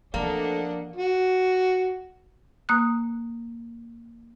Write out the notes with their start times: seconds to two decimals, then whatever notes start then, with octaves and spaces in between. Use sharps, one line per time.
0.14 E2 F3 A3 A#3 C4 D4 D#5 F#5
0.96 F#4
2.69 A#3 D#6 F#6